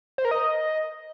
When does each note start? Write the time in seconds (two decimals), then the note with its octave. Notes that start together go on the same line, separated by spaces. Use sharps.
0.18 C5
0.25 A#4
0.31 D#5